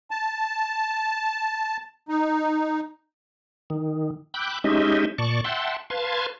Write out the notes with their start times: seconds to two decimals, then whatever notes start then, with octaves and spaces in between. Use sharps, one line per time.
0.11 A5
2.09 D#4
3.70 D#3
4.34 G5 B5 D6 E6 F#6 G6
4.64 G#3 C#4 D#4 G4 D#5 E5
5.18 A#2 D5 A5 C#6
5.44 E5 F#5 G5 A5 C6
5.90 B4 F5 A5 C6 G#6